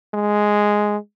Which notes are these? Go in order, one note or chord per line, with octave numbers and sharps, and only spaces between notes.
G#3